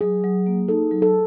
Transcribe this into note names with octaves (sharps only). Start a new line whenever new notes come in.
F#3 G#4
F#3
A#3
D#4 A4
F#3
A4